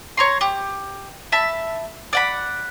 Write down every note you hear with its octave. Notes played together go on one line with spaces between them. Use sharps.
C#5 A#5 C6
G4
E5 A5 B5
D5 F#5 B5